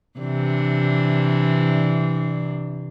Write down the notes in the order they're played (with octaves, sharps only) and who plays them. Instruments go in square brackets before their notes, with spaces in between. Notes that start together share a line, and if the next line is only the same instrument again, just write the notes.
[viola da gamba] C3 E3 D4